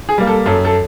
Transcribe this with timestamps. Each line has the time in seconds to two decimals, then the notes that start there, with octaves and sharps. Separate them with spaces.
0.09 G#4
0.18 G3 A#3
0.27 A4
0.46 F#2 A4
0.65 A4